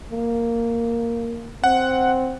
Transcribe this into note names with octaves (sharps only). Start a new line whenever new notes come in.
A#3
C4 F#5